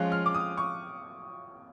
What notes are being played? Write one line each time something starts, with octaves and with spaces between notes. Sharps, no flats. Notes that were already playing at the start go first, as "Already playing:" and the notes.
Already playing: F3 G#3 C#4 F4 F#6
F6
D6
D#6
C#6